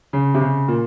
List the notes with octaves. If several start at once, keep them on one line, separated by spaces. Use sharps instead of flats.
C#3
C3
C#3
A#2